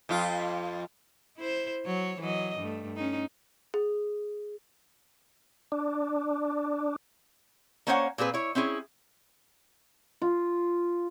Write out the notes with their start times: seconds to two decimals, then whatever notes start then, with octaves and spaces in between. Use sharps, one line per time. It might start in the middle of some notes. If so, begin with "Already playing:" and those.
0.09 F2 F4
1.38 E4 C5
1.85 F#3 C#5
2.19 E3 F#3 D#5
2.57 G2 A3
2.96 C#4 D#4
3.74 G#4
5.72 D4
7.87 A#3 C#4 C5 C#5 E5 F#5
8.18 A#2 C4 G#4 B4
8.34 E4 C#5
8.55 C4 C#4 E4 G#4
10.22 F4